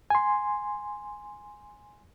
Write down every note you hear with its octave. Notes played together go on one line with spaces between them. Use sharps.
G#5 C6